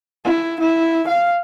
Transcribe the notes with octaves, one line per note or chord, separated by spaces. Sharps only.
E4
E4
F5